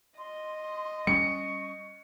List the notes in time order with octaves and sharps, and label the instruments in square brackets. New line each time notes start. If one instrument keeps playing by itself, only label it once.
[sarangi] D#5 [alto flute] C6
[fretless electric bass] G3 C#4 [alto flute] C#6 [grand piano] C#7